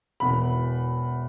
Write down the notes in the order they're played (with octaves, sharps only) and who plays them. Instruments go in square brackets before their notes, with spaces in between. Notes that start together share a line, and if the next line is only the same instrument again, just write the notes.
[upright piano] E1 E2 B2 B3 B5